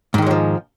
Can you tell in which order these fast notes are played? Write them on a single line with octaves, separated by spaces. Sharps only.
G#2 D#3 G#3 F#3 F3